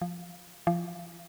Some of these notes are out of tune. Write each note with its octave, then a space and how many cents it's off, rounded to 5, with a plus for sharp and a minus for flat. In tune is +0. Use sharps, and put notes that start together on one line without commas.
F3 +5
F3 -30